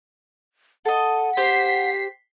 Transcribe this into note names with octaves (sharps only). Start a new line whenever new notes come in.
A4 D#5 F#5
G4 C5 B6 C7